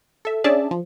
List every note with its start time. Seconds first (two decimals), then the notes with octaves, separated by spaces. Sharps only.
0.25 A4 E5
0.44 C#4 D4 G#4 D5 E5 A5
0.71 F3